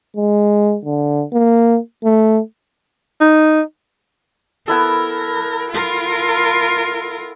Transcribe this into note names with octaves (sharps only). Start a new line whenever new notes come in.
G#3
D3
A#3
A3
D#4
B3 E4 A4 A#4
F4 A#4